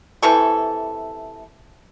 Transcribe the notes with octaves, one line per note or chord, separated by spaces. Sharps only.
C3 E3 A4 C#6